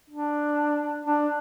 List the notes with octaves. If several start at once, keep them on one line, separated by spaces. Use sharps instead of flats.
D4
D4